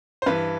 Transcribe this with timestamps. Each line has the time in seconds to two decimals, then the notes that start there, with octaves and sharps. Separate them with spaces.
0.22 C5
0.26 G2 E3 B4